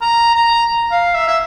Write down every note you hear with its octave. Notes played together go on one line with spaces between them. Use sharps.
A#5
A#5
F5
E5
E5